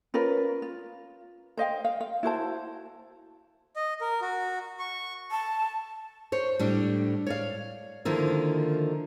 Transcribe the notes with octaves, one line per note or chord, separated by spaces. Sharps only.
C#4 F4 A#4 B4
F4
C5 D#5 F5 G5
F5
F5
E4 F#4 C5 A5
D#5
A#4
F#4
C#6
A5
C5 C#5
A2 G3 D4
C#5 D5 F5
D3 D#3 F3 A#3 E4